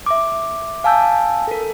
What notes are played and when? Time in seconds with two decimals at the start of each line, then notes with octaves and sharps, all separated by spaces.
0.06 E5 D6
0.84 F5 G#5 A5 E6 G6
1.48 A4 A#4